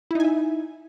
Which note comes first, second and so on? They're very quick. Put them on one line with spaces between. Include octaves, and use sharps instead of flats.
E4 D#4 G#5 E5